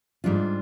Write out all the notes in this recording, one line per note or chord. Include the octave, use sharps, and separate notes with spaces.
G#2 G3 D4 F4